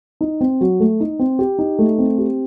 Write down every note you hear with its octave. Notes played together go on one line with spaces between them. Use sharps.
D#4
C4
F#3
A3
D#4
C4
G4
D#4
A3
C4
G4